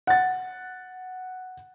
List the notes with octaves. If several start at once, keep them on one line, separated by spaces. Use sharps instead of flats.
F#5 A6